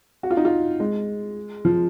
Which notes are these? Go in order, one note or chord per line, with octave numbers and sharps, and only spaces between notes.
F#4
F4
D#4
F4
G#3
F3